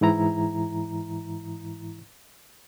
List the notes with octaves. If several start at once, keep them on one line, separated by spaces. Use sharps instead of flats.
G#2 E3 E4 A#5